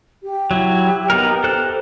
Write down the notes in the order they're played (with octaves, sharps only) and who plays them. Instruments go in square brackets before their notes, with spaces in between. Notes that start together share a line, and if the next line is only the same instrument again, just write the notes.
[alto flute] G4
[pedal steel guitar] F#3 E4
B3 D#4 A#4
A4 C5 F#6